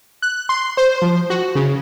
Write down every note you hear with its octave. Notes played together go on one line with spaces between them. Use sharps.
F#6
C6
C5
F3
F#4
C#3